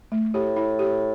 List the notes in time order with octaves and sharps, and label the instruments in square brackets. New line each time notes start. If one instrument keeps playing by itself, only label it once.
[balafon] A3
[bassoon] A2 [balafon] G4
[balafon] E4
G4